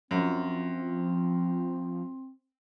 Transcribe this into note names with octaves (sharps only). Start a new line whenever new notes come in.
F#2 F3 C4